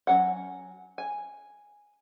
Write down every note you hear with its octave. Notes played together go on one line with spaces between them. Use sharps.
F#3 C#4 F#5
G#5